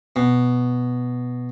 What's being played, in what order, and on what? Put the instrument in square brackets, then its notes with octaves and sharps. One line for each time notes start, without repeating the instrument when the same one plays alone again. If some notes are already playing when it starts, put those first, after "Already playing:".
[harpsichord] B2